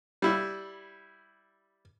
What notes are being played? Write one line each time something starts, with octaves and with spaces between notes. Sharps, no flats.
G3 E4